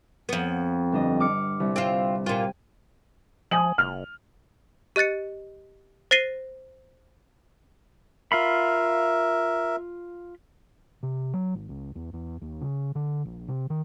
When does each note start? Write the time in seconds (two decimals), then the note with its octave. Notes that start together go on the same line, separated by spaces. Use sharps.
0.29 F2 B3
0.92 G1 D4 D#5
1.20 D6 F6 C#7
1.60 C2
1.76 C4 F4
2.26 A#2 F4 G5 G#6 D#7
3.51 F3 G#5 D#6 F#7
3.78 F#1 F6
4.96 G4 D#5 F#6 A6 C#7
6.11 C5 A6 A#6 C7 D#7 G7
8.32 F4 A#4 E5 F5 B5
11.03 C3
11.33 F#3
11.55 G#1
11.69 C#2
11.95 E2
12.13 E2
12.42 D#2
12.61 C#3
12.95 D3
13.25 A#1
13.48 C3
13.70 D#3